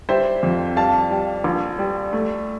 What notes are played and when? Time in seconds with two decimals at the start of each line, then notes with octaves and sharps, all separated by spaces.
0.09 G3 C5 E5
0.43 F2
0.76 G3 F5 A5
1.11 G3
1.44 A#1
1.79 G3
2.13 A3